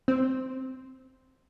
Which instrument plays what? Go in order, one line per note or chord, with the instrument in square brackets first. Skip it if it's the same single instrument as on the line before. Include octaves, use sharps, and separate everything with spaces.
[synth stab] C4